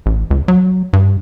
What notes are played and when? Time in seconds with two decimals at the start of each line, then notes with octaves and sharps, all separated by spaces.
0.06 A1
0.30 C#2
0.48 F#3
0.93 G2